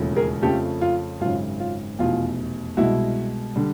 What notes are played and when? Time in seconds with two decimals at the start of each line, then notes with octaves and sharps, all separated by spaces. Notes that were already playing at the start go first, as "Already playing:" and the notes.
Already playing: E1 D#2 C#3 F3 A3
0.16 G#4 A#4
0.42 F2 C#3 F3 A3 C#4 G4 A4
0.81 F4
1.20 G#1 F#2 C#3 F4
1.60 F4
1.99 F1 E2 B2 F4
2.77 C2 B2 G#3 E4 F#4
3.56 D3 G3